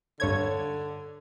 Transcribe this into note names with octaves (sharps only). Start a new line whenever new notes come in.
G2 D3 C#5 G#6